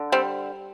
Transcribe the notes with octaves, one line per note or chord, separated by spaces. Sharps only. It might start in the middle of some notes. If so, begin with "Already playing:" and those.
Already playing: D3
G3 C4